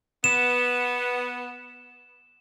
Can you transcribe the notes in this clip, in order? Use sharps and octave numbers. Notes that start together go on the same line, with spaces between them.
B3 E7